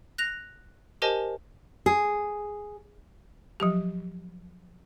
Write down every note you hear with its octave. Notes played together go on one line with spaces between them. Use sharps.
F#6 A#6 F7
G4 A#4 C5 D#5 G#5 A5
G#4
F3 F#3 G4